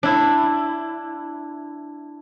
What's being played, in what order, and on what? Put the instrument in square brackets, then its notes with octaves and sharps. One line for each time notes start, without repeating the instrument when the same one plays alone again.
[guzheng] D4 E4